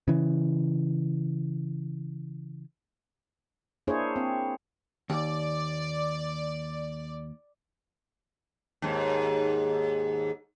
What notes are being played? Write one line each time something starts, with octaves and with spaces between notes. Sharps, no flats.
C#3 E3
A#3 D4 E4 G#4 C5 C#5
C4
D#2 D5
D#2 G#2